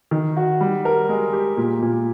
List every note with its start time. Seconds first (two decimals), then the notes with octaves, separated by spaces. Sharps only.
0.11 D#3
0.37 F#4
0.61 G3
0.85 A#4
1.09 G#3
1.33 G4
1.57 A#2
1.82 A#2